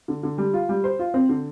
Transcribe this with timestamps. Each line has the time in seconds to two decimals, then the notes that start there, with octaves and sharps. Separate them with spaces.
0.08 D3
0.23 D3
0.38 G3
0.54 F4
0.69 G3
0.84 C5
0.99 F4
1.14 C4
1.29 D3